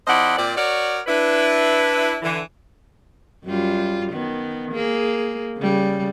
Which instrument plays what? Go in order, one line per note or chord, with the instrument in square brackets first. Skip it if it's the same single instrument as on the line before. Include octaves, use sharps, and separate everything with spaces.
[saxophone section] F2 E4 C5 D5 D#5 F#5
A#2 C4 D5
F#4 A#4 C#5 D5
D4 E4 B4
D3 E3
[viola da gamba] F#2 G3 F4
D#3 B3
A#3 G#4
C#3 G3